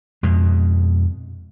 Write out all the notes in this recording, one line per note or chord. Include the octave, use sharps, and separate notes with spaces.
F2 B2 G#3